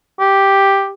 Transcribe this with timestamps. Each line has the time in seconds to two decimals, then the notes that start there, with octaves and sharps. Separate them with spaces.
0.20 G4